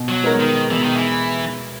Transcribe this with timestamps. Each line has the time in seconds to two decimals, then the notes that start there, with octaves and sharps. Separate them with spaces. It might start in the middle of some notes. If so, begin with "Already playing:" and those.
Already playing: B2
0.09 F#3
0.24 G#3 B3 D#4 A#4
0.40 D#3
0.71 B2 E3
0.83 D#3
0.96 E3